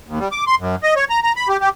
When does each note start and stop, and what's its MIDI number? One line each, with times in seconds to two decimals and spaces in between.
0.08 0.19 39
0.19 0.28 55
0.32 0.44 86
0.47 0.55 84
0.60 0.76 42
0.83 0.94 75
0.96 1.05 73
1.10 1.20 82
1.23 1.32 82
1.36 1.48 83
1.49 1.57 67
1.61 1.69 67